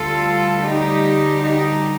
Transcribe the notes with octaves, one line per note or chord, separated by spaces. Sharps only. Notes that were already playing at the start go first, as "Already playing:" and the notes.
Already playing: D2 D3 G3 F4 A4
D#4 G4
D#4 G4